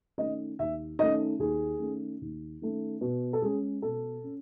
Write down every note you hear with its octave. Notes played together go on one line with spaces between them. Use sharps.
D#3 A3 C#4 D#5
D#2 E5
D#3 A3 C#4 D#5
D#2 G#4
D#3 A3 C#4
D#2
D#3 A3 C#4
B2
A4
G#3 C#4 G#4
B2 A4
C#4